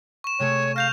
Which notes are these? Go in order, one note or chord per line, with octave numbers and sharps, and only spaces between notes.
C#6 E7
C3 A3 G#4 C#5
F5 F6 G6 A#6 F7